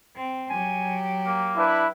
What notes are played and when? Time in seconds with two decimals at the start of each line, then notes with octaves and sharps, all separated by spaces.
0.16 C4
0.50 F#3 G4 G#5
1.26 A#3
1.57 D4 E4 B4